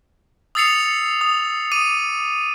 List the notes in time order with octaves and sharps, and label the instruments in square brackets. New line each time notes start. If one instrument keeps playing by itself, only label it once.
[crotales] D#6 E6 A6 C7 C#7 F7
D#6
D6 D#6 D#7